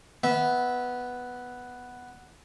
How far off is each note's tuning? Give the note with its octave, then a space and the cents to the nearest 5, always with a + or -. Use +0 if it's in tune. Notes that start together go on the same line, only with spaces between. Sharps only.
B3 +0 E5 -20